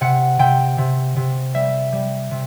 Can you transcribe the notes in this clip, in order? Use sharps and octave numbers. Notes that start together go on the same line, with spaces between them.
C3 F#5
C3 G5
C3
C3
G3 E5
G3
C3